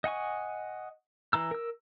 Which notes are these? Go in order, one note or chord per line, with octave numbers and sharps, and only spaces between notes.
D#5 F#5 G#5 C#6
E3 A#5 E6
A#4 E6